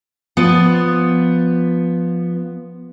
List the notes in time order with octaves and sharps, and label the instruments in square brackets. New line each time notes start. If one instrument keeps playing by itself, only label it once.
[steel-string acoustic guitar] F3 B3 D5